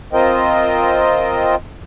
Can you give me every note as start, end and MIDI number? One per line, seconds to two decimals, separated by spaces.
0.13 1.55 60
0.13 1.55 65
0.13 1.55 70
0.13 1.55 72
0.13 1.55 75
0.13 1.55 79